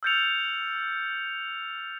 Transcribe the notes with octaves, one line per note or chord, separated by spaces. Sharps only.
E6 F6 G6 A6 C#7 F7